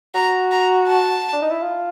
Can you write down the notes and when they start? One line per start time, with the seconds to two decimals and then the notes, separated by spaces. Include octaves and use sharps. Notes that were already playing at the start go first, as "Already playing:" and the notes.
0.15 F#4 A#5
0.51 A#5
0.87 A5
1.33 D4
1.42 D#4
1.51 E4
1.62 F4